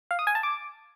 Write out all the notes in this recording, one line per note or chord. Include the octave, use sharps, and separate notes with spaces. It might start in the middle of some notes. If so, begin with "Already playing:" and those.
F5
D#6
G#5
A5
D6